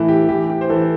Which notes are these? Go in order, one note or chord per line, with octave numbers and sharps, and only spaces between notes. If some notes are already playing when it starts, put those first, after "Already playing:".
Already playing: A2 E3 E4 A4
G4
E3 G4
G4
C5
E3 A4